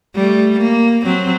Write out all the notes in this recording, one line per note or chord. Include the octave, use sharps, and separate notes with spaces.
G3 A3
A#3
F#3 C4